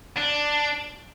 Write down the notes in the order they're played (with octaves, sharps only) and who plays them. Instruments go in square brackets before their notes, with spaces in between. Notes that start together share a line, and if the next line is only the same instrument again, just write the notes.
[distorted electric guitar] D4